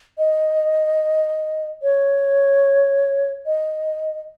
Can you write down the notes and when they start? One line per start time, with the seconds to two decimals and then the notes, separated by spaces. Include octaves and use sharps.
0.18 D#5
1.82 C#5
3.46 D#5